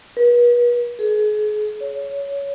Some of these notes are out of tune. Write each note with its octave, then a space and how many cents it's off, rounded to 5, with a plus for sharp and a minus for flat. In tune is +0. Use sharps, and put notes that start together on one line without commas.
B4 -40
G#4 +35
C#5 +15